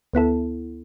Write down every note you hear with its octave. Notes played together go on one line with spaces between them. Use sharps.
D2 B3 E4 A4